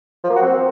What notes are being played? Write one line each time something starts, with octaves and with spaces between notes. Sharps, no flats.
F3
A#3
F#4
C4